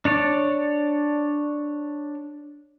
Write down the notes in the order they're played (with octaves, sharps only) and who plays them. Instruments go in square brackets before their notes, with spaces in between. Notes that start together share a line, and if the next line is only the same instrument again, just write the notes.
[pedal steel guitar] D4 C#5 D5